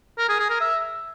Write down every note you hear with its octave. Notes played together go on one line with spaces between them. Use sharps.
A#4
G#4
G#4
A#4
E5